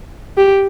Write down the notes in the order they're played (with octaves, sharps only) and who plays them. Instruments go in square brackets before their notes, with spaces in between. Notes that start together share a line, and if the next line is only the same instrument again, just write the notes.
[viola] G4